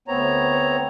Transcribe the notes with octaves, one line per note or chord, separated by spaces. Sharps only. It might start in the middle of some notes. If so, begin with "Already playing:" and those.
D2 B3 C4 C#5 A#5